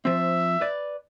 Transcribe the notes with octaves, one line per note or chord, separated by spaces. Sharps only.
F3 C4 E5
B4 D5